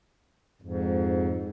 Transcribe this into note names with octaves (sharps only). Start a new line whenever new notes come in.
F2 G#2